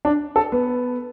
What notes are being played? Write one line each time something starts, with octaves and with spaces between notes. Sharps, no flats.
D4
A4
B3